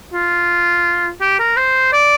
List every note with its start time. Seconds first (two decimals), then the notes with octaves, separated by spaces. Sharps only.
0.13 F4
1.21 G4
1.39 A#4
1.57 C5
1.93 D5